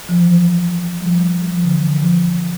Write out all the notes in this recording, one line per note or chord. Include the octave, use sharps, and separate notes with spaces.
F3
E3
F3
G3
F3
G3
G3
F3
D3
E3
D3
F3